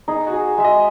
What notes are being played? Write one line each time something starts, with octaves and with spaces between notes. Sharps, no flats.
D#4 G#4
F#4
G#4
G#3 E5
D#5